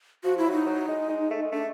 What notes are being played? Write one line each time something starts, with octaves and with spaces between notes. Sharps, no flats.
F3 F#4
E4
F#3
D#4
F#3
G#3
G#3
A3
G#3
A3 D4